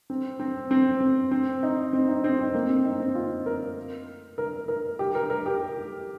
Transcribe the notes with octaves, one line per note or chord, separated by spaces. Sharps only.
C4
C4
C4
C4
C4
D#4
C4
D#4
C4
C4
A#3
C4
D#4
C4
F4
A#4
A#4
A#4
G4
A#4
A#4
G4